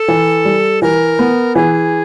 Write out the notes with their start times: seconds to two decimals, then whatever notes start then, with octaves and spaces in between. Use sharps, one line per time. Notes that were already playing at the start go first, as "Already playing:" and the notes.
Already playing: A4
0.08 E3
0.45 G3
0.82 E3 A#4
1.19 B3
1.55 E3 G#4